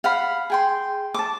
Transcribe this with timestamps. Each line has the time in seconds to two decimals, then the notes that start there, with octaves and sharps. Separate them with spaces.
0.04 F5 F#5 B5
0.50 G#4 G5 C6
1.14 A5 D6